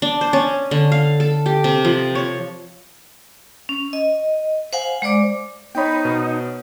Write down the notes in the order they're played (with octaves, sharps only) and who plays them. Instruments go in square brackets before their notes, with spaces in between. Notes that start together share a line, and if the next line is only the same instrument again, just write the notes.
[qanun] D4
C5
C#4
D3
F5
A4
G4
C3
F3
C#5
[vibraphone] C#4
D#5
C5 F5 F#5 G#5
G#3 C5 D5 D6
[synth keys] B3 C5 C#5 [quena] D#4 [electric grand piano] G5 B5
[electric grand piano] B2